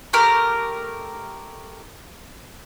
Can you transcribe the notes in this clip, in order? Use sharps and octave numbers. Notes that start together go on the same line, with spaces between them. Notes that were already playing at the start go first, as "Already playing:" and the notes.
A3 G4 A#4